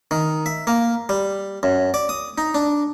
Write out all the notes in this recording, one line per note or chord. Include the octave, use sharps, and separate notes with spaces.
D#3
E5
A#3
G3
F#2
D5
D#6
D#4
D4